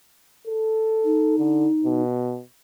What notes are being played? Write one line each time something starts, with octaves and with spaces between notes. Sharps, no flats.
A4
D#4
D3
B2